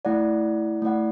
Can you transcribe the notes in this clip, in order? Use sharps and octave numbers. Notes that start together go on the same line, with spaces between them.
A3 E4 D5 F#5
A3 E4 D5 F#5